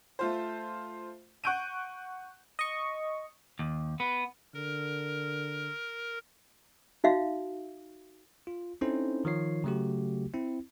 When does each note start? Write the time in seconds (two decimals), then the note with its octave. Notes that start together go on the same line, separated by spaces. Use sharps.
0.19 A3 F4 C5
1.44 F#5 C#6 F#6 G6 D7 D#7
2.59 D#5 C#6
3.59 D#2
4.00 B3
4.54 D3 A#4
7.04 D#4 F#4 E5 F5
8.47 F4
8.81 C4 C#4 D#4 E4 A4 C5
9.25 D#3 F3 F4 C#5 C7
9.64 C#3 F#3 A3 F#4 G4
10.34 C4 E4